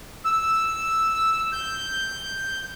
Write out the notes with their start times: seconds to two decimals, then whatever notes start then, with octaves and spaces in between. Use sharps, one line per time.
0.25 E6
1.53 G6